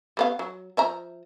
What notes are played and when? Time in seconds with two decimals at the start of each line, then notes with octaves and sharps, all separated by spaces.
0.17 G3 B3 F5
0.39 F#3
0.77 F3 E5 A#5